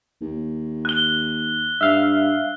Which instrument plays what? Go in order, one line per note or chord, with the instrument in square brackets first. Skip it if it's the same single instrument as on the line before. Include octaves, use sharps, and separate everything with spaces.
[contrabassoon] D#2
[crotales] F#6 G7
[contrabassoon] G2 [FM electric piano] E5 F5